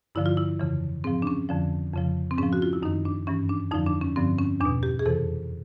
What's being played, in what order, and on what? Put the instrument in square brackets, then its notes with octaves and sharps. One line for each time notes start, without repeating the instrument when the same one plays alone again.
[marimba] G2 D3 F3 E4
F4
E4
F2 C#3 E3
G#2 F3 C4
D4
C#4
F2 D3 F3
F2 C#3 F3
C4
G#2 F3 C#4
F#4
F4
E4
F#2 D#4
D#3
D4
G2 E3 C#4
D4
F2 D3 F3 D#4
D4
C#4
G2 D3 F3 C4
C#4
E2 D4
B2
G4
G#4
F2 C3 E3 A4